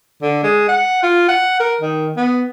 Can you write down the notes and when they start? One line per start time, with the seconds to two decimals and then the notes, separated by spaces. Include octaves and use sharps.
0.22 D3
0.44 G#3
0.68 F#5
1.03 F4
1.29 F#5
1.60 A#4
1.81 D#3
2.17 B3